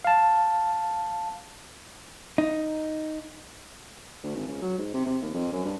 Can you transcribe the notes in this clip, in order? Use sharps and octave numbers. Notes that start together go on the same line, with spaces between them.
F5 A5
D#4
D2
G#1
C#2
F#3
G#2
C3
C3
D#2
F2
F#2
G2